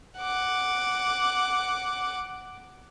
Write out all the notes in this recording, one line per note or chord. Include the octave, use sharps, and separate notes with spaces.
F#5 D6